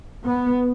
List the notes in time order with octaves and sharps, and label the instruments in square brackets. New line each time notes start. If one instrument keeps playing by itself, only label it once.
[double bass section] B3